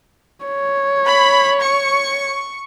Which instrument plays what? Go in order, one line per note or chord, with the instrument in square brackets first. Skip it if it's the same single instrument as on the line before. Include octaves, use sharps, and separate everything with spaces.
[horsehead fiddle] C#5
[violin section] B5
C#6